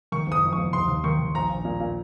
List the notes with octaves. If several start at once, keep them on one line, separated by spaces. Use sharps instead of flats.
D#3 C#6
F#1 D#6
F2
C#6
F#1
D#2 C6
D#2
D#3 C#6
D#3
A#1 A#5
A#1
A#2
A#2